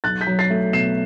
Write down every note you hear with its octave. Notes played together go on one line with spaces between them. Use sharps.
B1 F#6 A6
G6 B6
F#3
A6 C7
A3
B2 C7 E7